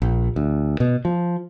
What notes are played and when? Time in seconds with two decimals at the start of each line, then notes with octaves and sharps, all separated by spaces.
0.02 A#1
0.36 D2
0.80 B2
1.05 F3